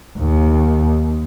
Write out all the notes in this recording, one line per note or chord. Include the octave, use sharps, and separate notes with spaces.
D#2